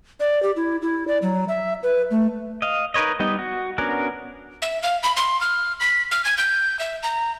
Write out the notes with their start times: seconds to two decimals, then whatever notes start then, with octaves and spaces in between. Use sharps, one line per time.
0.20 D5
0.43 G4
0.56 E4
0.82 E4
1.08 D5
1.22 F#3
1.48 E5
1.83 B4
2.11 A3
2.62 D#5 F5
2.94 D#4 A#4 B4 C#5 D#5
3.20 G3 B3 D#4
3.39 F#4
3.78 B3 C#4 D4 F#4 A#4
4.62 E5
4.83 F5
5.03 B5
5.17 C6
5.41 F6
5.80 B6
6.11 F6
6.25 G#6
6.38 G6
6.79 E5
7.03 A#5